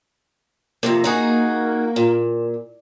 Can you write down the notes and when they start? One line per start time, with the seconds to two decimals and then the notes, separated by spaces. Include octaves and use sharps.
0.83 F2 G#2 C3 A#3
1.04 D#4 F#4 G#4
1.96 A#2